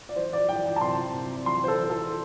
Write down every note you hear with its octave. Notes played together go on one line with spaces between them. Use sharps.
D5
E3 C5
D5
E3 G5
G5
A5
C3 C6
C3
E3 C6
C5
A4
E3
A4